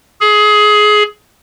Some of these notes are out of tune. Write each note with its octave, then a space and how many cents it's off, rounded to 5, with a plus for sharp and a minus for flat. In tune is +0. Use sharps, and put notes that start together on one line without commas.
G#4 +20